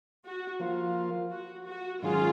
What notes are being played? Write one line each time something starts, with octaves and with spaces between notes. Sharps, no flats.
F#4
F3 A#3 F4
F#4
F#4
G#2 D#3 F#3 C#4 F4 G#4